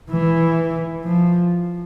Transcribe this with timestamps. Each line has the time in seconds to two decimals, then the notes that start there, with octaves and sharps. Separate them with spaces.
0.10 E3
1.04 F3